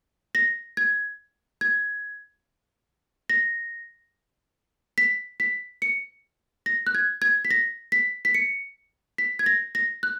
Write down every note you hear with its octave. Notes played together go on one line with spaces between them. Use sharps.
A#6
G#6
G#6
A#6
B6
B6
C#7
A#6
F#6
G#6
G#6
B6
A#6
B6
B6
C#7
B6
G#6
A#6
A#6
F#6